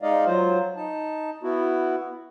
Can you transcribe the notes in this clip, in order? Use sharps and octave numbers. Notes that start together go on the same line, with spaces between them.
G#3 D#4 D5 D#5 F5
F#3 F4 C5
D#4 A5
B3 E4 F#4